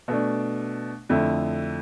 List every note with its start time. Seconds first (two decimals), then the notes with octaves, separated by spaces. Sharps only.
0.08 B2 A3 D4
1.09 F2 D3 A3 E4